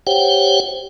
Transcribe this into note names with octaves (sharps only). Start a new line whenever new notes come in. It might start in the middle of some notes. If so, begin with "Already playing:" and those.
G4 C5 C#5 F#5 G5